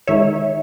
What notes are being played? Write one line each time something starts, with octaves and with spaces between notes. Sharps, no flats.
D#3 G#3 D#4 C#5 E5